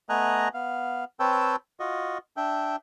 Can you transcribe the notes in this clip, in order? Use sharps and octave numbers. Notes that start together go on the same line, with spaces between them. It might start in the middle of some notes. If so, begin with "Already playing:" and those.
A3 B3 D#5 G#5 A#5 F#6
B3 F5
C4 B4 C#5 G5 A5 E6
F4 F#4 D#5
D4 E5 G5